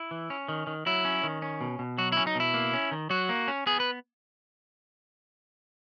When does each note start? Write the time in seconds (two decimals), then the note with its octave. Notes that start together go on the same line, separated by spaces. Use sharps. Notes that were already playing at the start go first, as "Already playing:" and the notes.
Already playing: E4
0.11 E3
0.30 C#4
0.49 D#3
0.67 D#3
0.86 F#3 E4
1.05 C#4
1.23 D#3
1.42 C#4
1.61 B2
1.79 B2
1.98 F#3 F#4
2.12 C#4 E4
2.27 D#4
2.35 B2 E4
2.54 A#3
2.73 C#4
2.92 D#3
3.10 F#3 F#4
3.29 A#3
3.48 C#4
3.66 B3 G#4
3.80 B4